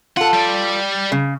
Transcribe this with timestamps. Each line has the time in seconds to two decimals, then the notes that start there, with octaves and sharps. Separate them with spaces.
0.17 F4 A4 F#5
0.33 G3 D5
1.12 C#3